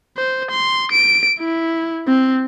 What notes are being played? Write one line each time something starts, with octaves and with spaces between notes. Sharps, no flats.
C5
C6
D7
E4
C4